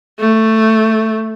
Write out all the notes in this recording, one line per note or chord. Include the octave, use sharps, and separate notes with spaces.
A3